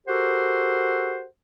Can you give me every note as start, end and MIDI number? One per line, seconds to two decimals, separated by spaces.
0.07 1.25 66
0.07 1.25 67
0.07 1.25 69
0.07 1.25 70
0.07 1.25 72
0.07 1.25 78